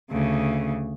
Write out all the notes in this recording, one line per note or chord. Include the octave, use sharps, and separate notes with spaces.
D2 C#3